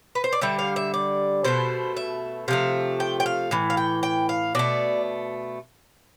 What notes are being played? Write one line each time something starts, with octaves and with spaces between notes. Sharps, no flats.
B4
C5
D5
D3 G3 E5
F5
E5
D5
B2 A3 C5
E5
C3 F3 A3 F5
G5
G5
F5
A2 E3
F5
G5
G5
F5
B2 A3 D5